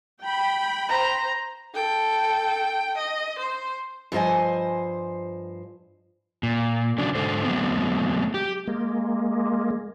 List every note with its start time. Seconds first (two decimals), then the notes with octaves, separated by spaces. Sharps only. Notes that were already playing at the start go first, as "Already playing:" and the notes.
0.22 G5 B5
0.89 C5 A#5
1.75 A4 G5
2.97 D#5
3.39 C5
4.12 G2 F3 C5 D#5 G#5
6.43 A#2
6.98 C#3 F#3 D4
7.15 G#2 D3 G#3 A4 C5
7.44 F#3 G#3 A3 B3 C4
8.34 G4
8.68 G#3 A#3